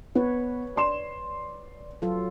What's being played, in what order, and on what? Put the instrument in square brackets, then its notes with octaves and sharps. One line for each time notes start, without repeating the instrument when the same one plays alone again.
[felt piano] B3 [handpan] B4 C#5
[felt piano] D5 C6 E7
[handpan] F#3 F4 A4